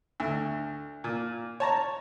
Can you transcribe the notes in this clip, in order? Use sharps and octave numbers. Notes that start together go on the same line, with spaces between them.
D2
A#2
C#5 A5 A#5